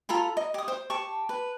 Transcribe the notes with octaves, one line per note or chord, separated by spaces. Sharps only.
F4 A4 A#5 B5
D#5
G4 D#6
C5
G4 A5 C#6
B4